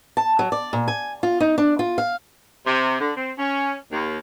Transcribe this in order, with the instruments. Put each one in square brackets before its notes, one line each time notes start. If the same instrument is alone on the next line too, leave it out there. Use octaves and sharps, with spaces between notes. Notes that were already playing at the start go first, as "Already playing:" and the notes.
[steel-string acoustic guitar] A5
F#3
D5
A#2
G#5
F4
D#4
D4
F4
F5
[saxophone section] C3
D3
C4
C#4
D#2